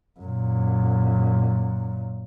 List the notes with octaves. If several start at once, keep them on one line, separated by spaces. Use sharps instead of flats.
F#2 A#2